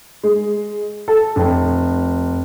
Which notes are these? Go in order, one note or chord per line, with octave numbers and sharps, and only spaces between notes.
G#3
A4
F1